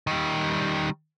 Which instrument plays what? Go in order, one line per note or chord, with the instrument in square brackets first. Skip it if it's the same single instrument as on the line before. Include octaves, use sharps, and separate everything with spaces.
[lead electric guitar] D#3 G3